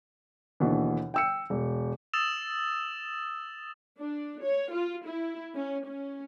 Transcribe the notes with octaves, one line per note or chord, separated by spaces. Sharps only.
D#2 B2 D3 E3
G5 E6 C#7
E1
D#6 E6 A6 E7 F7
D4
C#5
F4
E4
C#4
C#4